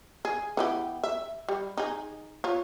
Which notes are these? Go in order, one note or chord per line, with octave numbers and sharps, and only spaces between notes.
G#4
E3 B3 G4
E5
G3
D#4 G#4
F4 C#5